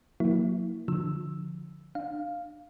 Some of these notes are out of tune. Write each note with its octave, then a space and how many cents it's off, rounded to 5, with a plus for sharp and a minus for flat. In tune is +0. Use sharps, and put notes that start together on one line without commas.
F#3 -30 A#3 +0 E4 -15
D3 +0 F3 +5 E6 +0
D4 +35 F5 +0